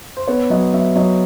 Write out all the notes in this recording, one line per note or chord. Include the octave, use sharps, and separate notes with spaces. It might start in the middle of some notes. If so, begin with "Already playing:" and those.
C5
B3 C#5
F#3 D#5
F#3 E5
F#3 D#5